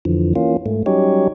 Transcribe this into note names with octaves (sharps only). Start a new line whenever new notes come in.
F2 D3 E3 F3
E3 A#3 C#4 F4
G#2 A3
F#3 G3 C#4 D#4 G4 C#5